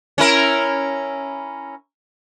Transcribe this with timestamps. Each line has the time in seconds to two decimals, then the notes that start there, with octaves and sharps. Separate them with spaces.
0.18 C#4 E4 A#4